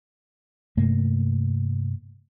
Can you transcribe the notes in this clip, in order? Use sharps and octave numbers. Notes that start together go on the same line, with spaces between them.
G2 C3 A3 A#3